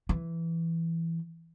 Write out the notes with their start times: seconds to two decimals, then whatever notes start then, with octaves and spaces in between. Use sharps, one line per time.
0.09 E3